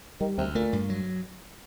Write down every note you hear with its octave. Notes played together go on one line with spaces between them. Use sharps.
D#3 G3
D2 C3
A#2 A3
G2
F#3